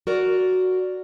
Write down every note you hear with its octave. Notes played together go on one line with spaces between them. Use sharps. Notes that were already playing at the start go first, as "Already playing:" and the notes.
F#4 A#4 D5